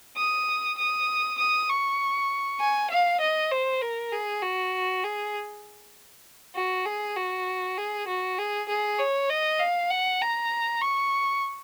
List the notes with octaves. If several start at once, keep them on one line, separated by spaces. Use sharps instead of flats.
D#6
D#6
D#6
C#6
G#5
F5
D#5
C5
A#4
G#4
F#4
G#4
F#4
G#4
F#4
G#4
F#4
G#4
G#4
C#5
D#5
F5
F#5
A#5
C#6